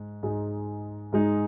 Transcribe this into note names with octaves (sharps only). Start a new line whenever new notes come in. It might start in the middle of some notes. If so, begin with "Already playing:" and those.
Already playing: G#2
G#2 G#3 D#4
G#2 G#3 D#4